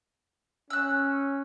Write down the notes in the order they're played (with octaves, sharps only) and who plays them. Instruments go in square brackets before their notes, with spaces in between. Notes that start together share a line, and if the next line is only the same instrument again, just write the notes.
[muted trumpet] C#4 [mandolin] E6 F#6